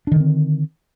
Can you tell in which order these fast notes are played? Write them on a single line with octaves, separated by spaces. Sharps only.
D4 D#3 D3 C4